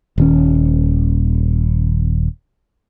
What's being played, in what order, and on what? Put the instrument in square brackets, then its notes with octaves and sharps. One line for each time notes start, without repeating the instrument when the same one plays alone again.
[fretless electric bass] D#1 D#3 C#4